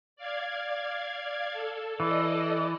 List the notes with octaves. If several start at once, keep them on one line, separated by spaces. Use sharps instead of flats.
D5 F5 G#6
A4
E3 A4 D5 D#5